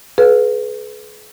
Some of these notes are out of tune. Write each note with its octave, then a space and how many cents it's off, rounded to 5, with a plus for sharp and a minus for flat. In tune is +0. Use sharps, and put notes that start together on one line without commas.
G#4 +40 B4 +0 F5 +30